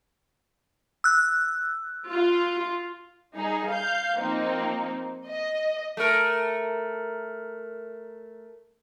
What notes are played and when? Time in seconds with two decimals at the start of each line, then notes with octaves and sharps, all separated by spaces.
1.04 E6 F#6
2.10 F4
3.33 G3 D#4 G#4
3.68 F5 G6
4.18 F3 A#3 C4 D#4
5.27 D#5
5.97 A3 A#4